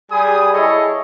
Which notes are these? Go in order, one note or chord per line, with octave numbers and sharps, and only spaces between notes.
G3 G#4 G#5 B5 D#6
E4 G#4 A4 C#5 D#5